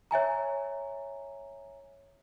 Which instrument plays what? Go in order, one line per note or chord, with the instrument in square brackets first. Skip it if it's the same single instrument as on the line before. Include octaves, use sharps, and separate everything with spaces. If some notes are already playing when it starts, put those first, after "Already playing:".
[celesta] C#5 E5 G#5 A#5